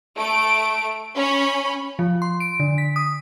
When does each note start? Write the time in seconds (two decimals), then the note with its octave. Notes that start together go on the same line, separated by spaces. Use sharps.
0.16 A3 D7
1.16 C#4 B5
1.99 F3
2.22 C6
2.40 D7
2.60 D3
2.78 B6
2.96 D#6